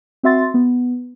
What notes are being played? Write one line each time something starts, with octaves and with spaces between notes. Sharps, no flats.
C4 F#4 E5 C6 A6
B3